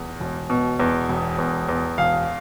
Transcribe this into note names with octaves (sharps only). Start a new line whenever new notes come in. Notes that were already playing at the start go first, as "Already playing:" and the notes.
Already playing: E2
E1
B2
E2
E1
E2
E2
E1 F5